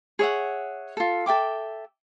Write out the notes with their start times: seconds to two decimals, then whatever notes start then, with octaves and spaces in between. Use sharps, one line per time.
0.19 G#4 C#5 E5 F#5
0.97 F4 A4
1.26 A4 E5 G5 D6